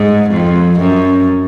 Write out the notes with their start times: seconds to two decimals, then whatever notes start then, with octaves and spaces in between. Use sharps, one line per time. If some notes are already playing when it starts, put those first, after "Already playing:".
Already playing: G#2
0.31 F2
0.80 F#2